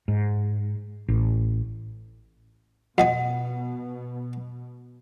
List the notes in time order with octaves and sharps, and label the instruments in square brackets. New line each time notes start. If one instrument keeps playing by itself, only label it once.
[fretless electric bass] G#2
A1
[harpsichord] F2 D#5 G#5 [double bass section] B2 [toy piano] F#5